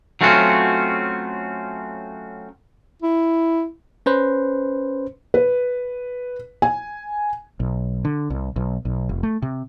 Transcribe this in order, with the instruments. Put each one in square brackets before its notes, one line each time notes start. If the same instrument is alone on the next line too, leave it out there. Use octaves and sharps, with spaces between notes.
[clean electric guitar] F#3 A3 C4 C#4 F4 F#4
[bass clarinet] E4
[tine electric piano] C#4 B4 C5
[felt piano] B4
G#5
[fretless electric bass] B1
D3
C2
B1
B1
F1
A3
C3